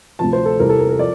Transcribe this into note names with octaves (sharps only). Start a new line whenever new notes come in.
D2 C3 F3 A5
C5
A4
E2 C3 G3 C4 A#4
A4
A#4
A#4
F3 D5